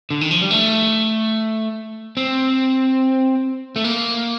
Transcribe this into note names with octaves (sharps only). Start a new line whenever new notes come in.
D3
D#3
F3
G3
A3
C4
A3
A#3